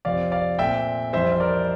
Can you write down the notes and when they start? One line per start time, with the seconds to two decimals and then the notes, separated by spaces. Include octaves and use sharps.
0.05 F2 C3 F3 C4 D5 F5
0.32 D5 F5
0.59 A#2 A3 C4 E5 G5
1.13 F2 E3 G3 C4 C5 E5
1.32 E5
1.40 A#4 D5